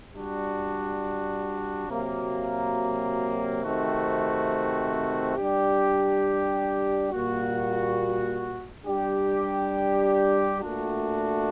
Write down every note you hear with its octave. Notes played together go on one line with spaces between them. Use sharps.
G3 D4 F#4
C3 F#3 A#3 F#4
C3 D#3 A3 C4 F#4
G3 D4 G4
A#2 G3 A#3 F#4
G3 D4 G4
A#2 A3 D4 F#4